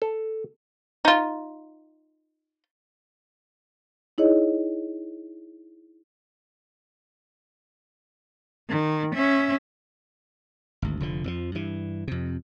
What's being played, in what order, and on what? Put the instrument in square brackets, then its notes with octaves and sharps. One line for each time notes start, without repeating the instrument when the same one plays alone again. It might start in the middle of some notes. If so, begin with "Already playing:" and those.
[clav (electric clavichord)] A4
[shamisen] D#4 F4
[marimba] D#4 E4 G#4 C#5 D#5
[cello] D#3
C#4 E5
[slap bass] G#1 D2
F1 D3 F3
F2 E3 F3
G2 E3
F2 C3